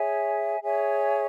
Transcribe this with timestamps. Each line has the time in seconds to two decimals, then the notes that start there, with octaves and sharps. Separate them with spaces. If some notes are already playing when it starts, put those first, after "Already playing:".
Already playing: G#4 C#5 E5 G#5
0.62 G#4 C#5 E5 G#5